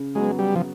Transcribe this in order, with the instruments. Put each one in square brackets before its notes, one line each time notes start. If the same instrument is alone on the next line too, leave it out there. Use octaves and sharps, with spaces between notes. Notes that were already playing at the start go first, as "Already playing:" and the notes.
Already playing: [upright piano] C#3
[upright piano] F#3 B3 [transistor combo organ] G#3
[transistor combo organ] G3
F3